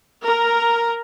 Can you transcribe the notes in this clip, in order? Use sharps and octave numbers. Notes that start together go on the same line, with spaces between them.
A#4